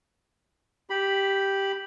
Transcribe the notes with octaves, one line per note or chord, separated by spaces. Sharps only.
G4 B5